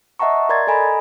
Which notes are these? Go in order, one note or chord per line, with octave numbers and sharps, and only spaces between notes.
D#5 E5 F#5 A5 A#5 C#6
A#4 D5 A#5 C6 G#6 A6
A4 D#5 G#5 A#5 B5